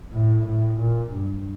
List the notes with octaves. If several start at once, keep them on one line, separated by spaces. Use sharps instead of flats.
A2
A2
A#2
G2